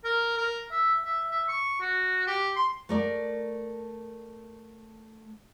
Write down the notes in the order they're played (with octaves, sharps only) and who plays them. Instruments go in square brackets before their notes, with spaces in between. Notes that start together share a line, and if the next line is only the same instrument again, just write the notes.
[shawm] A#4
A#4
E5
E5
E5
C#6
F#4
G4
C6
[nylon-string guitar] A3 A#4 D5